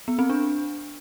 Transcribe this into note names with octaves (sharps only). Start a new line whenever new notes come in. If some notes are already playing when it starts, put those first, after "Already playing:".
B3
C4
D4